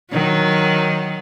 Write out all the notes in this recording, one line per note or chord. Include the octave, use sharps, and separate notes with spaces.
D#3 F#3